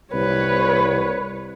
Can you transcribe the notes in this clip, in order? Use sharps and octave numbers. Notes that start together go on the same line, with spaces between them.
C2 B4 C#5